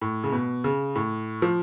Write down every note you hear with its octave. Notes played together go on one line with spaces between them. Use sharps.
A2
C#3
B2
C#3
A2
F3